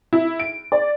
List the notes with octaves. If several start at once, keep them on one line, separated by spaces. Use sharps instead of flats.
E4
D7
D5